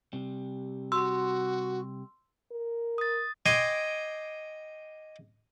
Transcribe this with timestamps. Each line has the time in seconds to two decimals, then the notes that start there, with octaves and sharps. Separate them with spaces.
0.13 C3 G3
0.92 F#4 C6 E6
2.52 A#4
2.98 D#6 A6
3.46 D#5 G5 G#5 C6 D6